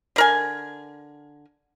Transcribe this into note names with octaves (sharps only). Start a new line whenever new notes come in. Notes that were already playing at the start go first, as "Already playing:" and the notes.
D3 A#4 G#5